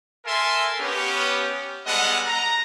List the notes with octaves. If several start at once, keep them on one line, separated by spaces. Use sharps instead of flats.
A4 A#4 E5 G#5 A5 C6
B3 C#4 G4
G3 G#3 B3 A4 D#5 F#5
A#5